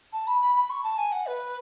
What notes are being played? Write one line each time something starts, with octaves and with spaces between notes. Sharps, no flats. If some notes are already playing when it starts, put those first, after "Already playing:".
A5
B5
B5
B5
C#6
A5
G#5
F#5
B4